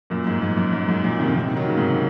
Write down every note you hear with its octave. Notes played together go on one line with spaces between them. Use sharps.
F#2 A#2
G#2
G#2
F#2
F#2
G#2
F#2 A#2
C3 D#3
C3 D#3
D#3 F#3
C#3
G#2 C3